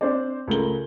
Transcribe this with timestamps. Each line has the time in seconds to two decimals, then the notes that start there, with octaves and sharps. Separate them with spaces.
0.01 C4 D4 C5 D5
0.47 C#2 A3 A#4 G7